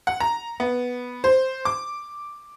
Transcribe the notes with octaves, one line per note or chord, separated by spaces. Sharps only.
F#5
A#5
B3
C5
D6